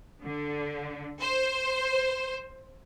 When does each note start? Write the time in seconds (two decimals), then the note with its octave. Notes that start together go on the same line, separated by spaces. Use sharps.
0.23 D3
1.19 C5